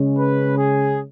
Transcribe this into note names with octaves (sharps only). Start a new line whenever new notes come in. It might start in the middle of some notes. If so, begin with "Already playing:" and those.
Already playing: C#3 G#3 C#4
B4
G#4